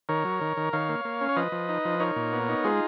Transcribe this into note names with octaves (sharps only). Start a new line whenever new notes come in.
D#3 A#4 C#5
F#3
D#3
D#3
D#3 C#5 F5
A#3
A#3
C#4
C#5
F3 B4 D#5
F3
D#4
F3
D#4 A#4 C#5
A#2
B3
D#4
G#3 F4 G#4